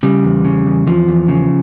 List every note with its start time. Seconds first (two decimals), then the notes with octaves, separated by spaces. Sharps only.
0.03 C#3 G3
0.24 E2
0.45 C#3
0.66 E2
0.87 E2 F3
1.08 E2
1.28 C#3